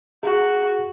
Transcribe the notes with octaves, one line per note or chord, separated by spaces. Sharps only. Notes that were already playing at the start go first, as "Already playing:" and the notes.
F#4 G#4